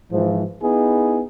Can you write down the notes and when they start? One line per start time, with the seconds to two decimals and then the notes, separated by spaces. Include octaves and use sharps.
0.11 G#2 E3 F3
0.62 B3 D#4 E4 G#4